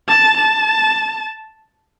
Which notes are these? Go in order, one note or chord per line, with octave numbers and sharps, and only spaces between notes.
A5
A5